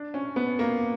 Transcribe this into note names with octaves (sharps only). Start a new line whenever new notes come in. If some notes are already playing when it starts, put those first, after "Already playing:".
Already playing: D4
C#4
B3
A#3